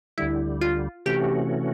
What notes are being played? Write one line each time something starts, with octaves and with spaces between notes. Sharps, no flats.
D2 D3 G3 E4
F4
C3 E3 A3 C#4 F#4 G4